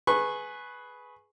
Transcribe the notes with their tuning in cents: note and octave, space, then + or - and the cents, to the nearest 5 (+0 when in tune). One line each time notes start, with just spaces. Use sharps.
G#4 +15 B4 +0 C#6 -20